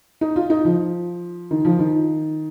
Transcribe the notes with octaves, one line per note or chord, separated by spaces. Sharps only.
D#4
F4
D#4
F3
D#3
F3
D#3